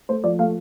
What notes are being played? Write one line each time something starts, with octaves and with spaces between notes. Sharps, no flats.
A3 C5
F3 D5
A3 F5